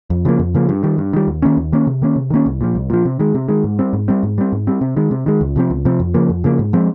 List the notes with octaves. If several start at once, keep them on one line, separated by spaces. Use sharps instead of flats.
F2
C#3 F3 A#3
F2
C#3 F3 A#3
G2
D#3 G3
G2
D#3 G3
D#2
D#3 A#3 C#4
D#2
D#3 A#3 C#4
C3
D#3 A#3 C#4
C3
D#3 A#3 C#4
C2
A#2 F3
C2
A#2 F3
C3
D#3 G#3
C3
D#3 G#3
G#2
G3 C4
G#2
G3 C4
G#2
G3 C4
G#2
G3 C4
C3
D#3 G#3
C3
D#3 G#3
C#2
C3 F3 C4
C#2
C3 F3 C4
F2
C#3 F3 A#3
F2
C#3 F3 A#3
G#2
F3 G#3 C4